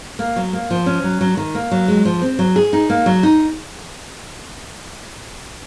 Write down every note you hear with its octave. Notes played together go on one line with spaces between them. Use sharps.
A#3
F#3
A#3
F3
C#4
F#3
F#3
D#3
A#3
F#3
G#3
F3
C4
F#3
G#4
D#4
A#3
F#3
D#4